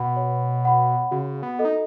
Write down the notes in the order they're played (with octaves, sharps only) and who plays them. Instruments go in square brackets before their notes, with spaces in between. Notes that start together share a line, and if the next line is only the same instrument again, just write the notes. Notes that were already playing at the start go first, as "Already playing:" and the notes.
Already playing: [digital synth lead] B2 [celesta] F#5 B5
[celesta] C#5
F#5 B5
[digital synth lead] C#3 [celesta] F#4
[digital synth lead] B3
[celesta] A4 D#5
[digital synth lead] D#4